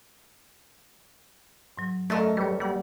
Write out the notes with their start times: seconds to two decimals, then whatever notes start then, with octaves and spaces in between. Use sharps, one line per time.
1.77 G#2 F#3
2.10 F#2 A3 A4 A#4 D5 D#5 F5
2.37 G3 B4 C#5
2.60 G3 A#3 F#5